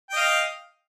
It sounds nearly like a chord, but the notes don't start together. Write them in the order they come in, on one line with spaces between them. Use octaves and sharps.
G5 D#5 F5